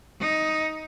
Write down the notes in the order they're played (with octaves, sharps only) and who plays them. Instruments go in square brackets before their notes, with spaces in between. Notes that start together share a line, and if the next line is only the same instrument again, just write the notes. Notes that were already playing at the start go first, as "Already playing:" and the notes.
[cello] D#4